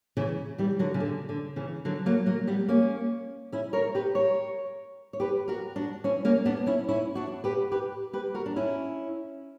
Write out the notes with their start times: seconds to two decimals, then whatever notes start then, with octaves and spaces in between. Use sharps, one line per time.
0.17 C#3 E3
0.58 E3 G3
0.79 D3 F#3
0.94 C#3
1.00 D3
1.29 D3
1.56 C#3 E3
1.85 D3 F#3
2.06 F#3 A#3
2.26 F#3 A#3
2.47 G3 B3
2.68 A#3 C#4
3.52 C#4 E4
3.73 A#4 C#5
3.95 G4 B4
4.15 A#4 C#5
5.13 C#5
5.20 G4 B4
5.48 F#4 A#4
5.76 D4 F#4
6.04 C#4 E4
6.25 A#3 C#4
6.46 B3 D4
6.66 C#4 E4
6.88 C#4 E4
7.15 D4 F#4
7.44 G4 B4
7.72 G4 B4
8.13 G4 B4
8.34 F#4 A#4
8.46 D4
8.56 C#4 E4